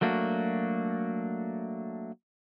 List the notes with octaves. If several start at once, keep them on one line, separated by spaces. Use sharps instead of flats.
F#3 A3 A#3 D4 F#4